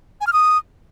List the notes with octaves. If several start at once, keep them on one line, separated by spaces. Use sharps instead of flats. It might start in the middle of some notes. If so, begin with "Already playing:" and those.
G#5
F6
D#6